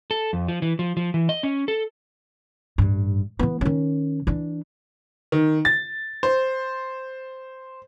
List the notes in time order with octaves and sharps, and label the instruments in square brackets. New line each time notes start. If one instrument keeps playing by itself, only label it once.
[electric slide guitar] A4
F2
F3
E3
F3
F3
E3
D#5
C#4
A4
[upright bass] A1 G2
E3 B3
D#3 C#4
E3 D4
[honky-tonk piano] D#3
A6
C5